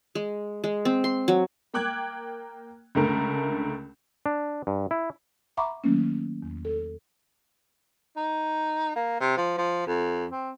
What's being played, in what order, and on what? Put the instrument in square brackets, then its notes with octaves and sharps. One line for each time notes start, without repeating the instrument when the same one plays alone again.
[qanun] G#3
G#3
C4
C6
F#3
[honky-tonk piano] A#3 G5 D6 F#6 G#6
C#2 D3 A3 A#4
[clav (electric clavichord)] D4
G2
E4
[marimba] E5 F#5 A#5 B5 C#6 D6
D#3 F#3 A3 A#3 C#4
E2
A4
[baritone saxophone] D#4
A#3
C3
F3
F3
F2
C4